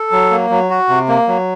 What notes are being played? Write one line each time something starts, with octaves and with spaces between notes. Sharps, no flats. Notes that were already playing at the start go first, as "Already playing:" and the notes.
Already playing: A4
F#3
A#3
F#3
F#4
C3
A#3
F#3